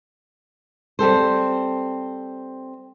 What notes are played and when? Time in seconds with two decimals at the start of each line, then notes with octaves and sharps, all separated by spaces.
0.99 G3 C4 A4 C5